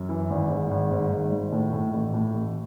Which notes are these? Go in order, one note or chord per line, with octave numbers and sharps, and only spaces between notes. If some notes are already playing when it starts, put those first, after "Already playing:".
Already playing: F#2
E3
G#1
G#2
G#1
G#2
G#1
G#1
A2
A2
A1
A2
A1